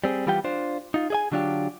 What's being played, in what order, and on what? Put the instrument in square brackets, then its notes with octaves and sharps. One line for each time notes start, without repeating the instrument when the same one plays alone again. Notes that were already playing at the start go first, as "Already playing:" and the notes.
[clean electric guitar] G3 C4 G#4
E3 G3 B3 F4 G4 G5
D4 F4 C5
D#4 F4
G#4 D#5 G#5
D3 F#3 D4 F4 G4